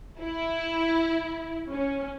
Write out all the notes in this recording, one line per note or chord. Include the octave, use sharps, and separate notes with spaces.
E4
C#4